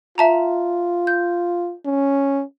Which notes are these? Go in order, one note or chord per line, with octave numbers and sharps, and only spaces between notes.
F4 E5 A5 A#5
G6
C#4